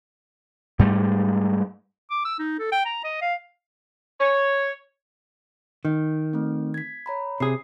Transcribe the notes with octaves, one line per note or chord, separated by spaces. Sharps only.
G#2 G3 A3
D6
E6
D#4
A4
G5
A#5
D#5
F5
C#5
D#3
A3 C4
G#6 B6
C#5 A#5 B5
C3 G#4 D#6 C7